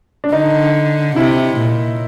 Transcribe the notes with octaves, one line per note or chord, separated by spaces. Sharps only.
D4
D3 D#4
C3 E4
A#2